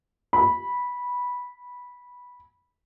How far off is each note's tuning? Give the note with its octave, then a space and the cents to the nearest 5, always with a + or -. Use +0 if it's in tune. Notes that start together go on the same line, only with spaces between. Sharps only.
B5 -10